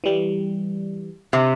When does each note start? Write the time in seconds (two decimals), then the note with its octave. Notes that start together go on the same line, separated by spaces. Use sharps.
0.04 E3 G3
1.33 C3